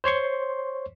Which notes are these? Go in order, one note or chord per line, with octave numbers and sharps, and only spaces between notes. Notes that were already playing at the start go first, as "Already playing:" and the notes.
C5 C#5 C6 C#6